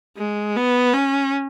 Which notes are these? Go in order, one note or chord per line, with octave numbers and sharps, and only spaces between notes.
G#3
B3
C#4